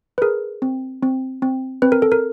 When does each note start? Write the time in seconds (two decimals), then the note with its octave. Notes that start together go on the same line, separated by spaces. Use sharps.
0.18 B4
0.22 G#4 A#4
0.62 C4
1.03 C4
1.42 C4
1.82 C4 B4
1.92 A#4
2.02 A4
2.12 A#4